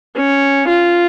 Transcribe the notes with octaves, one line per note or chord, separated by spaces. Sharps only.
C#4
F4